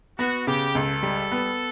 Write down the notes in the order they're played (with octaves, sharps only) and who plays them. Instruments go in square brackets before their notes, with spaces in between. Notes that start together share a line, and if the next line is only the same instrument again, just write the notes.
[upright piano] B3 [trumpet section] F#4
[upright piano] C#3 [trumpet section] G4
[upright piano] C#2 [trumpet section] A4
[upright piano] G3
B3